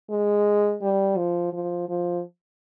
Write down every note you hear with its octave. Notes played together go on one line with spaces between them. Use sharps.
G#3
G3
F3
F3
F3